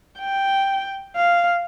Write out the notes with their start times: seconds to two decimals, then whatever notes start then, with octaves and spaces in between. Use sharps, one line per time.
0.20 G5
1.16 F5